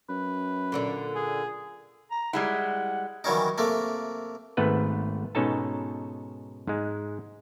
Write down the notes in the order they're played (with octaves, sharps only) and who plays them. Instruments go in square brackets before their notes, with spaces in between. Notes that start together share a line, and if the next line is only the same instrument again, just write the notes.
[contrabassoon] F#2 [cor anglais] B4
[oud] A#2 D3 D4
[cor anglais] G#4
[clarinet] A#5
[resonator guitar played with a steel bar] G3 G#3 E4 [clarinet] F#5
[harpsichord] D#3 E3 F#3 G3 C#4 D#4
C3 A3 A#3
[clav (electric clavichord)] G#1 G#2 A3 B3 B4
G#2 B2 C#4 D#4 A4 A5
G#2 G#3